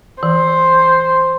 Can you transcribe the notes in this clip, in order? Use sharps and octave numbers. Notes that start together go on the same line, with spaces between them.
E3 C5